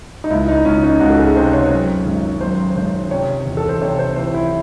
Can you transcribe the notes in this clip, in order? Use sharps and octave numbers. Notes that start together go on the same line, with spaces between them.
D#4
C#2 E4
D#4
C#2 C#4
D#4
C#2 F#4
A4
G#4
C3 C5
C#5
F#2
G#1
F#2 C5
G#1 C5
C3 C#5
E2
A4
C5
C3 C#5
C5
E3 C5
E4